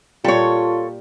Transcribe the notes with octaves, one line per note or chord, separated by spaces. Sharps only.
A#2 G3 F4 A4 C#5